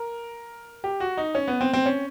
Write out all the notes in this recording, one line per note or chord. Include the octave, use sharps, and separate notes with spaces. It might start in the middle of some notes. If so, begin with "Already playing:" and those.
Already playing: A#4
G4
F#4
D#4
C#4
B3
C4
C4
C#4